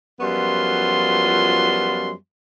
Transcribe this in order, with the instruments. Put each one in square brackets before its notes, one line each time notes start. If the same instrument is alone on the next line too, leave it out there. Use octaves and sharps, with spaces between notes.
[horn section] F#2 F3 G3 B3 F4 C6